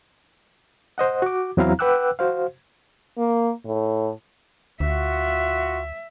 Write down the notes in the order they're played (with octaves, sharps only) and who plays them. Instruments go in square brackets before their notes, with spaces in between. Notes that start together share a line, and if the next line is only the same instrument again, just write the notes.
[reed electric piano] C5 D#5 F#5
F#4 D6
E2 F#3 C4 E4 F5 A#5
B4 F#5 G5 D6 E6 F#6
F#4 C5 F5
[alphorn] A#3
A2
[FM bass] D2 [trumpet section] F4 F#4 [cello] E5